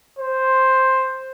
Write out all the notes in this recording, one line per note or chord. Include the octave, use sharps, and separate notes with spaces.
C5